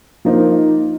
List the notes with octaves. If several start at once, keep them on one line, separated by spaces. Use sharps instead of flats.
F3 A#3 D#4